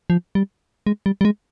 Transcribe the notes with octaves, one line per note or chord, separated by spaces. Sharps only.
F3
G3
G#3
G3
G3
G#3